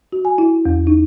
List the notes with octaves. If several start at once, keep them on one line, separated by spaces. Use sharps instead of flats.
F#4
G#5
E4
E2
D#4